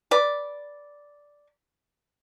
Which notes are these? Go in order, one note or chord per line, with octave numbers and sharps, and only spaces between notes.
B4 D5